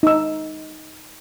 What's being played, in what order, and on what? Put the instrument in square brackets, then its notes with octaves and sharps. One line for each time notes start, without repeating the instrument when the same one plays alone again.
[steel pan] D#4 E6